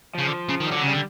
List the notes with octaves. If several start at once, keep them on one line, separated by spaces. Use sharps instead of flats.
C#3 F3
D3
C#3
D#3
G3
D3 F#3
C#3
G3
D3